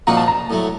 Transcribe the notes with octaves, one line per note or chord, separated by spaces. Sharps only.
A#2 F3 A#3 D#4 F#4 A#5
A5
A#5
A2 F#3 A3